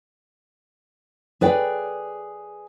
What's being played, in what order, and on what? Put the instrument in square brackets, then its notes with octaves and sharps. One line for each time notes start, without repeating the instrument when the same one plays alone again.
[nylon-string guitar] G#4 B4 D5 G5